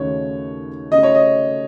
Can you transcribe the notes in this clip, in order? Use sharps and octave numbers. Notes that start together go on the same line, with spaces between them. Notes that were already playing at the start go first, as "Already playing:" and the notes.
Already playing: D#2 C#3 A3 D#4 F#4 C#5
C#3 A3 D#4 F#4 D#5
C#5
D#5